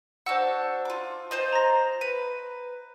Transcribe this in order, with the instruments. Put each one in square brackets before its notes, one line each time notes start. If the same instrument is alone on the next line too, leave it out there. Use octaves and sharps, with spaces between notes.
[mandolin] D4 F#4 E6 [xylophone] C5 F#5
[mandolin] F4 D6
F4 C5 D#5
[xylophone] A#5 A#6
[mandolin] B4 [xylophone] D#7